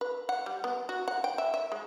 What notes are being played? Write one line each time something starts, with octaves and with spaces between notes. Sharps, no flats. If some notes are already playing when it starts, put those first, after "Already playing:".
B4
F#5
G3
B3
F#4
F#5
G5
E5
E5
G#3